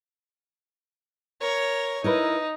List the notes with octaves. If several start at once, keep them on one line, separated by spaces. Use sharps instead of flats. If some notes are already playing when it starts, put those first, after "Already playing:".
A#4 C#5
D#4 E4 A#4 B4